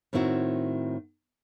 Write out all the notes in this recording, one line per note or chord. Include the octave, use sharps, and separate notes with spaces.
A2 D#3 C4 E4 F#4